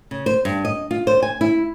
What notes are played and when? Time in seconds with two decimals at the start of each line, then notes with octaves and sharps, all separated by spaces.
0.11 C#3
0.26 C5
0.45 G2
0.65 D#5
0.91 F4
1.07 C5
1.22 G#5
1.41 E4